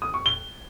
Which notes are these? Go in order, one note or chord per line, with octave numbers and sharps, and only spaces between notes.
D#6
C#6
G7